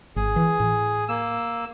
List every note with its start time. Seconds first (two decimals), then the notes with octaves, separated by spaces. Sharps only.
0.16 G#1 G#4
0.36 E3
0.60 A2
1.09 A#3 E6